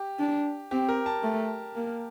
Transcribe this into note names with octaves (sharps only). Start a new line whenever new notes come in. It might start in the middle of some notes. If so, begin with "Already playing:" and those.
Already playing: G4
D4
C4 G4
A#4
A5
A3
A#3